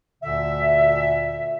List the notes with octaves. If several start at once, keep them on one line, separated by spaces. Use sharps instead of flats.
D2 A#2 D3 E5